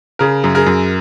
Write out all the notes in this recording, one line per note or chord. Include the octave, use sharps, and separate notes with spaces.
C#3 G#4 A#4
F#2
G#4 A#4
F#2